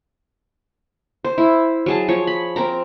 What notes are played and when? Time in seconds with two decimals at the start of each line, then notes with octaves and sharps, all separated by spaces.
1.24 C5
1.38 E4
1.86 F#3 G#4 A5
2.08 F3 C#5
2.27 B5
2.56 C4 A#4 A#5